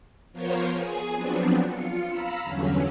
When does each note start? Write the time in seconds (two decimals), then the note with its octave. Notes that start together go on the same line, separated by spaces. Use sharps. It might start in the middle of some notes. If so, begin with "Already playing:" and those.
0.33 F3 B3 F4 A#4 C5 C#5
0.71 G#4 G#5
1.15 F3 F#3 B3 C4 D4
1.66 F4 C#7
2.08 F5 A#5 B5 E6
2.42 E2 G2 D3 F#3 C#4